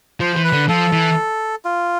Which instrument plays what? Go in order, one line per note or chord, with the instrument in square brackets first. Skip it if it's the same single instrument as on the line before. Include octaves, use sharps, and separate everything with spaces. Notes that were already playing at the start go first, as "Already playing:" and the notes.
[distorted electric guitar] F3 [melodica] C5
[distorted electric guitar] E3
[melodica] B4
[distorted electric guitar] D3
[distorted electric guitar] F3 [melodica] A4
[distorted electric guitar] E3
[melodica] F4